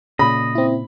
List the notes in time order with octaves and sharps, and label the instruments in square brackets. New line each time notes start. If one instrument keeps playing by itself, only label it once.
[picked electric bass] A#2 C#3 [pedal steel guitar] D#5 [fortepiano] B5
[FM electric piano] C4 E4